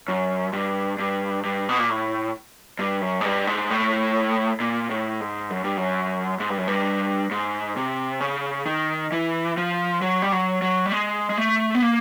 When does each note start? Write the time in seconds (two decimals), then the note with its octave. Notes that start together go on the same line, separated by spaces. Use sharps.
0.08 F#2
0.53 G2
0.99 G2
1.44 G2
1.69 B2
1.79 A#2
1.90 A2
2.79 G2
3.02 F#2
3.21 G#2
3.25 G2
3.47 G#2
3.70 A2
4.60 A#2
4.90 A2
5.20 G#2
5.50 F#2
5.64 G2
5.77 F#2
6.40 G#2
6.50 G2
6.58 F#2
6.68 G2
7.31 G#2
7.77 C3
8.21 C#3
8.66 D#3
9.12 E3
9.57 F3
10.02 F#3
10.22 G3
10.32 F#3
10.62 F#3
10.86 G3
10.92 G#3
11.30 G#3
11.37 A3
11.75 B3
11.82 A#3